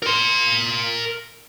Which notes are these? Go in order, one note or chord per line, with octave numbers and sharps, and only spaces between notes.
A#4 C6